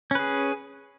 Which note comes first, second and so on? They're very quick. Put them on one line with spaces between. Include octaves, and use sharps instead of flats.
C#4 B4 G#4